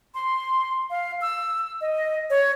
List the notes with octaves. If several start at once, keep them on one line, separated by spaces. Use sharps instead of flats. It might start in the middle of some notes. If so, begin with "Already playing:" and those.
C6
F5
E6
D#5
C#5